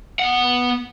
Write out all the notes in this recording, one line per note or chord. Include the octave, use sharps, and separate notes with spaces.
B3 F#5